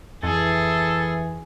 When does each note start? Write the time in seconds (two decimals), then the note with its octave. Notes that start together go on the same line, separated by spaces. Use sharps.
0.23 F2 E3 G#4 A4